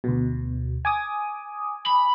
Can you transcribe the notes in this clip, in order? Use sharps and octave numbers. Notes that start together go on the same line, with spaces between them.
D2 B2
G#5 D6 D#6
B5